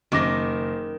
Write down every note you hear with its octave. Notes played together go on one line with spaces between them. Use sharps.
F#1 D#3 D6 A#6